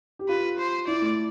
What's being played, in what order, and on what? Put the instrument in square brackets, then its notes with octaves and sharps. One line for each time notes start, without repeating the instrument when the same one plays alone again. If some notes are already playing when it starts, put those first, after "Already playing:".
[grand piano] G4
[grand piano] F4 [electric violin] B4
[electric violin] C5
[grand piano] E4 [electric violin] D5
[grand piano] A3